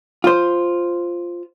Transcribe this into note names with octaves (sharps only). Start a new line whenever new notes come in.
F4 C5